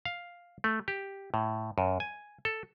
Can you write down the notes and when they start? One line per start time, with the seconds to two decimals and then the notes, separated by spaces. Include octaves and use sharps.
0.05 F5
0.64 A3
0.88 G4
1.34 A2
1.78 F#2
2.00 G#5
2.45 A4